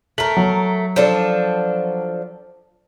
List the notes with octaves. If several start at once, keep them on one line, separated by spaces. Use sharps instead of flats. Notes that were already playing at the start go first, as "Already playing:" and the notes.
A3 A#4 F#7
F#3
F3 D4 A4